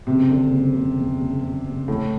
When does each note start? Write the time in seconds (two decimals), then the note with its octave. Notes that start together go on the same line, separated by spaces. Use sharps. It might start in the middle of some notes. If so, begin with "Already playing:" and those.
0.07 F#1 C3
0.30 D3
0.52 F#1
0.75 F#1
0.97 E2
1.20 F#1
1.43 F#1
1.66 F#1
1.88 A2 E3